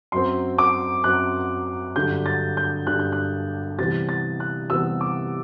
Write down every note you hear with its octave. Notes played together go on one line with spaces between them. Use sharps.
F#2 F#3 C4 C6
D6
F#2 F#3 C4 F#6
G2 D3 F#3 G6
A6
G6
G2 D3 F#3 F#6
G6
F#6
C3 E3 G3 B3 A6
A6
F#6
C3 E3 G3 B3 E6
D6